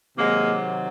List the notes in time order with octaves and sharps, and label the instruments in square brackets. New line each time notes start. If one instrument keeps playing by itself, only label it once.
[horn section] C3 D#3 F#3 G#3 A#3